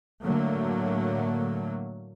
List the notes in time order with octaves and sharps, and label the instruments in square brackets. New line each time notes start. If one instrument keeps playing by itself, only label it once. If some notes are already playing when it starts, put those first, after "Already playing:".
[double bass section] A2 D3 F#3 A3 A#3